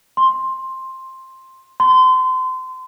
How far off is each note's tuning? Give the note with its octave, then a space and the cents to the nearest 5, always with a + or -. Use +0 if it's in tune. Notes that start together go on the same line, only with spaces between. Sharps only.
C6 +10
C6 -30